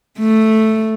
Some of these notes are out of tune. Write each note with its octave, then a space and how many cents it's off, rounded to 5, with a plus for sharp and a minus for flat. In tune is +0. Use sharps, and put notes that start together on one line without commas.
A3 +0